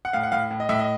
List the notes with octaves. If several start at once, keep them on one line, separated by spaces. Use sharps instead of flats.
F#5
A2 F5
F#5
A2 F5
A2
D#5
A2 E5
D#5